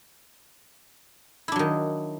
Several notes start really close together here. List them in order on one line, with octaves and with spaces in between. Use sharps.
E4 D4 F#3 D#3